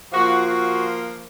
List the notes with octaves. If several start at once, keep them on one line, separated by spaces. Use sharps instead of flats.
F3 A#3 F4 F#4
F#4